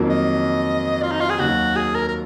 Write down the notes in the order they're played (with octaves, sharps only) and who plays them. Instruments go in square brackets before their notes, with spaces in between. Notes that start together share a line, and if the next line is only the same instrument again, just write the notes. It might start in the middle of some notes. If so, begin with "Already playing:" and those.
Already playing: [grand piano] F2 D#3 F#3 A#3
[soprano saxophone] D#5
F4
D#4
F4
G#4
[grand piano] D#2 D#3 F#3 [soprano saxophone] F#4
[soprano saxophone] G#4
A#4
A#4